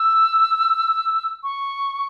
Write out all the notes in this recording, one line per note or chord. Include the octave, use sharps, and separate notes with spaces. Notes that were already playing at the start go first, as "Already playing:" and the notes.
Already playing: E6
C#6